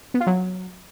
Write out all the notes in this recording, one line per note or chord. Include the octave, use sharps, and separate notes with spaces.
B3
F4
F#3